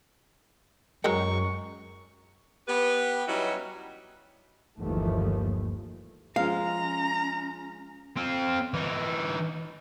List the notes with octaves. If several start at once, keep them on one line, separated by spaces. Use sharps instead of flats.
F#2 F#3 G#3 A#4 C#6
B3 G4 B4
F#3 G3 C#4 D#4 E4 F#4
G1 D#2 E3 F3 A3
F3 G#3 C#4 F5 A#5
C4 F4
E3 D#4